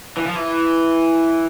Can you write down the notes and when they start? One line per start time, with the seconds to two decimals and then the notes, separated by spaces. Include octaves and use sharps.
0.17 E3
0.27 F3
0.36 E3